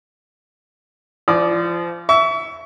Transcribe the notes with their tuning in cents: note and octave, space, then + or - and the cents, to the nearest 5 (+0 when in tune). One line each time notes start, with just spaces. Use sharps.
F3 -30 D5 -5 D#6 -25
E5 +0 C#6 +35